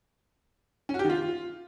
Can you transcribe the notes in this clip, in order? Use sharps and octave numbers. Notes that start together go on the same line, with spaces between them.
C#4
F#4
G4
D#3
F4